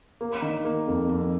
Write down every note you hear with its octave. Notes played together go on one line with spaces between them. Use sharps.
A#3
D#3
A#3
F2
F2